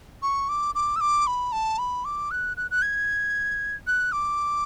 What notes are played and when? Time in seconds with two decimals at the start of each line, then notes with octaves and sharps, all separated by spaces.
0.22 C#6
0.49 D6
0.75 D6
0.96 E6
1.01 D6
1.27 B5
1.52 A5
1.78 B5
2.05 D6
2.31 F#6
2.57 F#6
2.71 F#6
2.82 G#6
3.87 F#6
4.12 D6